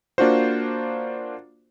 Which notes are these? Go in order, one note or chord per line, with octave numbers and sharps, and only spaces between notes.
A#3 D4 F4 F#4 C5